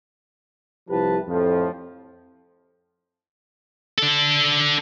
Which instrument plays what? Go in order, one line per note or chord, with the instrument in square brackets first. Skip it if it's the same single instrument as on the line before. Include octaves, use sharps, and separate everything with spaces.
[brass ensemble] C2 F3 E4 G4 B4 A5
F2 A2 F3
[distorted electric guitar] D4 A4